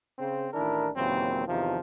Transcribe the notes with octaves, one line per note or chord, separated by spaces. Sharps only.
C#3 C4
A1 D#3 D4 E4 A#4
D#2 A#2 C#3 E3 F#3 C4
E2 C3 D#3 F3